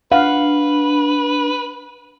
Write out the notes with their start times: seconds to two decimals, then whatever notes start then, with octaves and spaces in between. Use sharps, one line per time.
0.12 D4 B4 F5 F#5